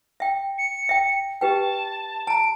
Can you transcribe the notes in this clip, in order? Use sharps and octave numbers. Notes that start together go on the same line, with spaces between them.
E5 G5
C#7
E5 G5
G4 B4 G5 A5
A5 A#5 D7